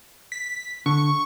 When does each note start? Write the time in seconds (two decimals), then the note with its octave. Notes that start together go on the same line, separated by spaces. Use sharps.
0.32 B6
0.86 D3 C#6